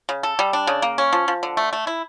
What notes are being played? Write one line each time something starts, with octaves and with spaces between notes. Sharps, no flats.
C#3
A4
G3
D4
C#3
A#3
C#4
F3
F3
D3
A3
A3
E4